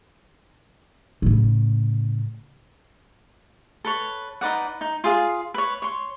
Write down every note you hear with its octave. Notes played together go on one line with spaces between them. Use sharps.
A2 C#3
A4 B4 C#5
D#4 B4 D5 F#5
D#4
F4 G#4 F5
B4 C#5
C#5 C6